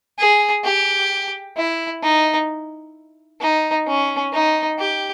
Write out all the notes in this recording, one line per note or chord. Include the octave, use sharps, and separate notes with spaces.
G#4
G4
E4
D#4
D#4
C#4
D#4
G4